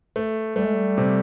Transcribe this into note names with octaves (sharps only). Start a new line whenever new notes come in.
A3
G3 A3
G#3
G3
C3